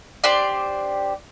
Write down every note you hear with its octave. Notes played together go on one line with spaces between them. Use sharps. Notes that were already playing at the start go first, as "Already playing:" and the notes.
D4 G4 C5 D5